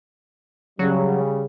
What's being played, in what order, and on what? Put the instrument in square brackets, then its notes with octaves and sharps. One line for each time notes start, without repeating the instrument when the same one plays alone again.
[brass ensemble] C#3 G3 [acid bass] F#3